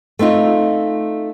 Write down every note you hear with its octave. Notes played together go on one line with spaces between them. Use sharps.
A3 C4 D#4 F4